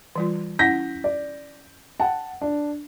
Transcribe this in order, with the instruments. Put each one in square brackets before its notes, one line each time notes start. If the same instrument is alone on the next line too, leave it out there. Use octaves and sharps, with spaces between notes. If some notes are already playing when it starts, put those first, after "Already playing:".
[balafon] E3 G3 F4
[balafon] C#4 E4 F#5 [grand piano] G6 A#6 B6
[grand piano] D5
[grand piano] F#5 A5 [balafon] G5
[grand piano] D4